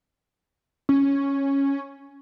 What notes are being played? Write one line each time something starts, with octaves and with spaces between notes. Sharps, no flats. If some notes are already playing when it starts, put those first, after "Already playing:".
C#4